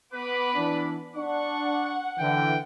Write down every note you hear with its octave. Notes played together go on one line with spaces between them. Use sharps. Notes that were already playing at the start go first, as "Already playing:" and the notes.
B3 B4 B5 D6
E3 D4
D4 F#5 C#6
D3 E3 G5